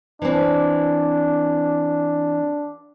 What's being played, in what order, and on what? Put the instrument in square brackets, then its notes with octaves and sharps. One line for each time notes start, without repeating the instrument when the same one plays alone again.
[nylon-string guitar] E3 C4 [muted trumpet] D4